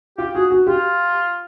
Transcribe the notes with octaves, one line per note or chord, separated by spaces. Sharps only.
F4 G4
F#4 G#4
F#4
F4 G4